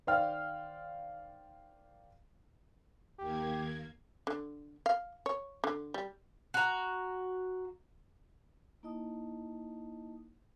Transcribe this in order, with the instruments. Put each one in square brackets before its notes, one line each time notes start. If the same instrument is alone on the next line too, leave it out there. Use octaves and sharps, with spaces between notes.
[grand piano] D#3 C5 D5 F5 G5 F6
[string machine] D#2 A#3 G#6 [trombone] G4
[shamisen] D3
F5
C#5
D3
G3
[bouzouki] F#4 A#5
[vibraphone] A#3 D#4 E4 D#5 A5 D#6